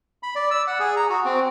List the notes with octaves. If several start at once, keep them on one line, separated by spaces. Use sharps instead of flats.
B5
D5
E6
F#5
G#4
A#5
F#4
C4